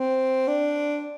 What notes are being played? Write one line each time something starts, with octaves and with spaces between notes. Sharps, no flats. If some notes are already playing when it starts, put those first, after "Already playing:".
Already playing: C4
D4